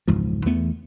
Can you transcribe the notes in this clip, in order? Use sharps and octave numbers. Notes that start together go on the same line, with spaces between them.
E1 C#2 G#2 F3
E2 E3 A3 B3